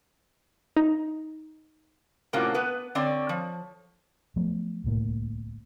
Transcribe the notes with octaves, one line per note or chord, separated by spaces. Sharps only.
D#4
A2 C3 A#3 C#4 F4 F#4
B3 B4
D3 C4 C#5 D5
F3
F3 F#3 A3 B3
D1 C2 A2 A#3